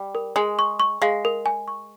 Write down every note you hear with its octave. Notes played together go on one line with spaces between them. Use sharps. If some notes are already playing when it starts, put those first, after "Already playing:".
Already playing: G3
A#4
G#3 G#5
C#6
C#6
G#3 F5
A#4
G#5
C#6